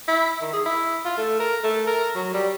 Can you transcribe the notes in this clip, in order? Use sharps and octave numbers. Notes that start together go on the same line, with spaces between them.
E4
D#3
G#4
E4
F4
A3
A#4
A3
A#4
F#3
G3